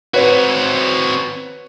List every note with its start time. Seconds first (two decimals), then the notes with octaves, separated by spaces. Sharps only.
0.14 C4 F#4 B4 C#5